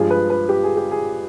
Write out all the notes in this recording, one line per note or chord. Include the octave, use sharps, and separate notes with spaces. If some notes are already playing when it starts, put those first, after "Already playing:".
Already playing: G2 F3 G#3 G#4
B4
B4
G4
G#4
G4
G#4